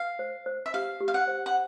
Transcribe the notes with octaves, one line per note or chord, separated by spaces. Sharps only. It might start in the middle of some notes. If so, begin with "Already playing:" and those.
Already playing: F5
C5
C5
E5
G4 F5
G4
F5
F#5
C5
F#5